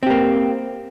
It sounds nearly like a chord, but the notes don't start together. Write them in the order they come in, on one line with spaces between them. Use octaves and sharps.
C4 G4 A#3